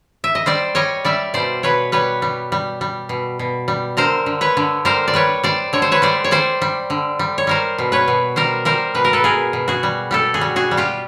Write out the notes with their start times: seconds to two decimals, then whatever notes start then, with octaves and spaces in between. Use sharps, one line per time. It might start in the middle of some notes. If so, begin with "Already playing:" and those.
0.24 E5
0.35 D#5
0.46 G3 C5 D5
0.75 G3 C#5 D#5
1.05 G3 D5 E5
1.34 B2 C5 D5
1.63 B2 B4 C#5
1.92 G3 B4 C#5
2.22 G3
2.52 G3
2.81 G3
3.09 B2
3.39 B2
3.68 G3
3.97 D3 A#4 C5
4.26 D3
4.41 B4 C#5
4.57 D3
4.85 G3 A#4 C5
5.08 D5
5.14 G3 B4 C#5
5.43 G3 C5 D5
5.73 D3 C#5
5.82 C5
5.92 B4 C#5
6.02 G3 C5 D5
6.24 C#5
6.31 G3 C5 D5
6.62 G3
6.90 D3
7.19 G3
7.38 C#5
7.47 G3 A#4 C5
7.78 B2
7.92 B4 C#5
8.08 B2
8.36 G3 A#4 C5
8.65 G3 A#4 C5
8.95 B2 B4
9.05 A#4
9.13 A4 B4
9.24 B2 G#4 A#4
9.53 B2
9.68 F#4 G#4
9.83 G3
10.11 G3 G4 A4
10.34 F#4 G#4
10.41 G3
10.56 F#4 G#4
10.71 G3
10.77 F4 G4